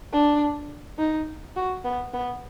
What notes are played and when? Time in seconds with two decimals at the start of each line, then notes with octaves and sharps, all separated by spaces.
0.12 D4
0.98 D#4
1.56 F#4
1.85 B3
2.13 B3